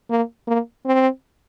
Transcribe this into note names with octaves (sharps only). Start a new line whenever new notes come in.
A#3
A#3
C4